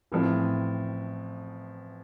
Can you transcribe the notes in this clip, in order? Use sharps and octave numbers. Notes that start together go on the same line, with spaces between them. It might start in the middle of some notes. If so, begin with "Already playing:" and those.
A1 A2 F3 C4